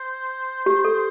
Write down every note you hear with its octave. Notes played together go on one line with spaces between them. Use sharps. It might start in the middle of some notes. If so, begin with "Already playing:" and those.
Already playing: C5
G4
A4